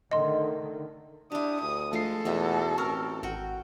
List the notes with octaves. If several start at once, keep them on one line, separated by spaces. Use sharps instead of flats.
D3 D#3 A3 D#5 C6
D4 E4 G4 D#6
D2 D#6
F3 G#3 A3 F4 A4 C7
E2 B2 D#4 E5
A1 C4 A#4 C#6 E6 F6
G#1 F#4 F#5 G5